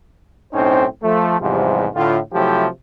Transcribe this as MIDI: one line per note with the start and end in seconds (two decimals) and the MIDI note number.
0.53 0.85 35
0.53 0.85 45
0.53 0.85 60
0.53 0.85 61
0.53 0.85 63
0.53 0.85 72
1.03 1.37 53
1.03 1.37 57
1.40 1.87 40
1.40 1.87 44
1.40 1.87 48
1.40 1.87 53
1.40 1.87 55
1.95 2.18 45
1.95 2.18 50
1.95 2.18 65
2.33 2.67 48
2.33 2.67 53
2.33 2.67 54
2.33 2.67 57
2.33 2.67 64
2.33 2.67 67